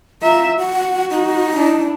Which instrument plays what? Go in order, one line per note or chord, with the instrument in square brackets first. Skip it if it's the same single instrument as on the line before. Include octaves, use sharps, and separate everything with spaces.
[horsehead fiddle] F4 E5 [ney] A#5
[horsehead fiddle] F#4 [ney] F#5
[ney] D#4
[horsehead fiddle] D4 E4